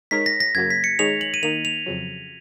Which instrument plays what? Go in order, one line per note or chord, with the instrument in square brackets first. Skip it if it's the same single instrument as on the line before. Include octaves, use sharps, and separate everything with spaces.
[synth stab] G#3 D#4 A#4 C#5 [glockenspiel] B6
[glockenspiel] A#6
A#6
[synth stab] F#2 C#3 F#3 A#3 [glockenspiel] G#6
[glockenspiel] B6
C#7
[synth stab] D#3 G#3 D#4 G#4 C#5 [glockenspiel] F7
[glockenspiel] F#7
D#7
[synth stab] D#3 A#3 D#4 [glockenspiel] F7
[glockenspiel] F7
[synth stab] F2 C#3 F#3